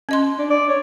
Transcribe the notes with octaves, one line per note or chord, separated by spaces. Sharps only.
C#4 D#5 C6
D4
D5
C#5